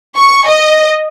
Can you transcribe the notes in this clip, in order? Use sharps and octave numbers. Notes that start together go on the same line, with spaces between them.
C#6
D#5